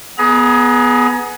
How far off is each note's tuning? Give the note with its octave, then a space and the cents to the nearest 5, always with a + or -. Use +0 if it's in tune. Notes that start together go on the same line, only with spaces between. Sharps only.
B3 +0 G#4 +20 A#5 +35